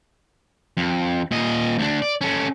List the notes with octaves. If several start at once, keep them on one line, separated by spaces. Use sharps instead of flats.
F2
A#2 D#5
D2 D4
D5
C#4 A4